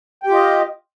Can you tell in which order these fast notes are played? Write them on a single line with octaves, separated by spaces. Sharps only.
G5 G4 F4 D#5